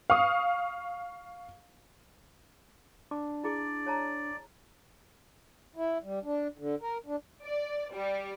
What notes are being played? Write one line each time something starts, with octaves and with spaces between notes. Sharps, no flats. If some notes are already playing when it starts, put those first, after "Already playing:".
F5 C#6 D#6
D4 D6
E4 G#4 D5 D6
C#5 A5 A#5
E4
G3
D4
D3
A#4
D4
D5
G3